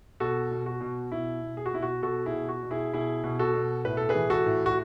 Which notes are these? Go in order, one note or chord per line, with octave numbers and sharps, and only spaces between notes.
B2 F#4 A4
B2
F#4
B2
B2 E4
B2
G#4
F#4
B2 E4
F#4
B2 F#4 A4
E4 G#4
B2
F#4
B2
E4 G#4
B2 E4 G#4
B2
F#4 A4
B2
A2 B4
A4
G#4 B4
E3
F#4 A4
A2
F#4